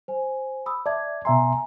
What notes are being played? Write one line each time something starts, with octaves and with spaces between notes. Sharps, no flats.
C5 G#5
B5 D#6 E6
D5 E5 A5 G#6
B2 E5 G#5 A#5 C6